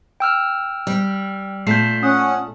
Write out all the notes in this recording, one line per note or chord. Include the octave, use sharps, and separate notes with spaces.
G5 E6 F6
G3
A#2 A3 A5 G6 B6 C7
C#4 F#5 D#6